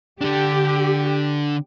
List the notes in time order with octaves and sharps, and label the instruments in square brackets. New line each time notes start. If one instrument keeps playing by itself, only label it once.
[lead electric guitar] D3 D4 [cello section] G4